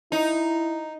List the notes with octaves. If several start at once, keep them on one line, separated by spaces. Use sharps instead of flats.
D#4 E4